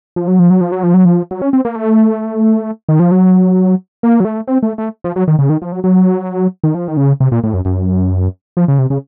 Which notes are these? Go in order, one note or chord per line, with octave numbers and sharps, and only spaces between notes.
F3
F#3
F3
F#3
F3
F#3
F3
F#3
F3
F#3
C#4
C4
A#3
A3
D#3
F3
F#3
A#3
F#3
A3
C4
A3
A3
F3
F#3
D#3
C#3
D#3
F3
F#3
F#3
D#3
F3
D#3
C#3
C3
A#2
A2
F#2
F#2
F3
C#3
C3
C#3